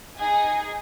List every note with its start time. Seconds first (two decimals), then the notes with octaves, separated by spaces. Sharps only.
0.17 D#4 G#4 D#5 G#5